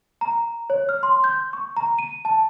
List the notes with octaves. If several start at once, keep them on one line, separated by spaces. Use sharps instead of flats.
A#5
C#5
F6
C6
G6
C#6
A#5
D#7
A5